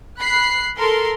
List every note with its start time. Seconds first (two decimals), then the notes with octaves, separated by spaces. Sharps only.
0.19 B5 F#6 C7
0.77 A4 A#4 C6